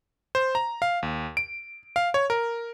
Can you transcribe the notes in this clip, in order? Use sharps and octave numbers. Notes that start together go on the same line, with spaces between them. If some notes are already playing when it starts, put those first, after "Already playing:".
C5
A#5
F5
D#2
D7
F5
C#5
A#4